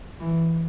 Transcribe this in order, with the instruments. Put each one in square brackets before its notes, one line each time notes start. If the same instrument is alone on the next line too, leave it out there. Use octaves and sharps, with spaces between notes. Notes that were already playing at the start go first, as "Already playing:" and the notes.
[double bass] E3